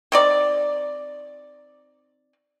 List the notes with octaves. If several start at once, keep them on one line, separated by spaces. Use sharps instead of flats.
D#3 C4 D5